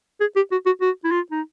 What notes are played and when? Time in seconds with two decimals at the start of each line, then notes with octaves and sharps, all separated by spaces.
0.20 G#4
0.36 G4
0.52 F#4
0.66 F#4
0.81 F#4
1.05 E4
1.11 F4
1.31 D#4